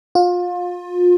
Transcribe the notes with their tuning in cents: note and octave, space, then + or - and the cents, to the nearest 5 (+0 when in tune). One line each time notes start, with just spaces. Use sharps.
F4 +30